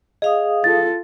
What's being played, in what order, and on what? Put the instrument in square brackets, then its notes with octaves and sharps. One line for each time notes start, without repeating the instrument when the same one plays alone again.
[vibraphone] G#4 F5 D#6 [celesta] D#5
[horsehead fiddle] F4 A4 [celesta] A6